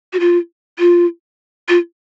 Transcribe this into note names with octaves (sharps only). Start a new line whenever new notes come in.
F#4
F4
F4
F4